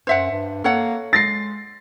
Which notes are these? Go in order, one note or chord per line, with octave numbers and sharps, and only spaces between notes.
F#2 C5 E5 F#5
G2
A#3 A4 C#5 F#5
G#3 A6 A#6 C7